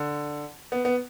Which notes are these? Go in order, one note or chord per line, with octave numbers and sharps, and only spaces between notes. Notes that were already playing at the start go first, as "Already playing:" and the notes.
Already playing: D3
B3
B3